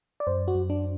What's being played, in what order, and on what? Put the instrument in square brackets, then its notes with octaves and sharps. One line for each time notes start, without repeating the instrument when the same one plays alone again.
[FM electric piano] D5
F#2 C5
F#4
F#2
D4